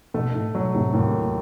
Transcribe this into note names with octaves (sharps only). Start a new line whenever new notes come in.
B2 A3
A2
B2 F#3
A2 C3
D#2 A2 C3